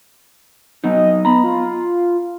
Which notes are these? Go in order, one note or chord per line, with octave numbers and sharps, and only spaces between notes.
F#3 B3 D#4 D#5
B3 A#5 B5
F4